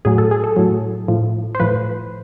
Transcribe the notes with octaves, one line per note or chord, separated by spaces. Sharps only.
A2 F#3 G#4
A4
G#4
A4
A2 F#3
A2 F3
C5
A2 F3 B4